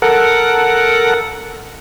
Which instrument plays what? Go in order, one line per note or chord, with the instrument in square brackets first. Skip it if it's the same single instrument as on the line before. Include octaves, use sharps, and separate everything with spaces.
[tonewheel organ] A4 A#4 F#5